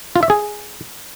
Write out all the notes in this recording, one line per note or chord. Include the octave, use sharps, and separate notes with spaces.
F4
E5
G#4